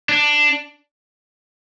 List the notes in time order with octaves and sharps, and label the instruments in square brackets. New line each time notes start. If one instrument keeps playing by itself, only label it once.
[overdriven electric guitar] D4